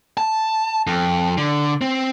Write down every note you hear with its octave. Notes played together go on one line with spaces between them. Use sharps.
A5
F2
D3
C4